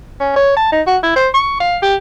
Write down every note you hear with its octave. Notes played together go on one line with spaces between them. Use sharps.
C#4
C#5
A5
D#4
F#4
E4
C5
C#6
F5
G4